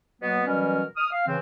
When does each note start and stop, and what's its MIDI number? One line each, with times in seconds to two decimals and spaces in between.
0.22 0.43 47
0.22 0.43 54
0.22 0.43 58
0.22 0.43 59
0.46 0.82 47
0.46 0.82 52
0.46 0.82 54
0.46 0.82 55
0.46 0.82 61
0.46 0.82 70
0.96 1.11 87
0.96 1.11 89
1.12 1.26 77
1.27 1.37 49
1.27 1.37 52
1.27 1.37 60